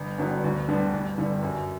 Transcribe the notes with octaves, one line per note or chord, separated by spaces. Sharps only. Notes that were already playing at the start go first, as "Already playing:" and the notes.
Already playing: G1
G2 D3 F#3 B3
D2
D3 G3 B3 D4
G1
G2 D3 G3
F#2